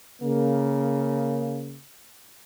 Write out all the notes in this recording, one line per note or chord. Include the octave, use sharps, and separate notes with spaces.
C#3 A#3